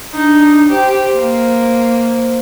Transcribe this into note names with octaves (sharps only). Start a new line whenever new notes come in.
D4 D#4
G4 C5
A#3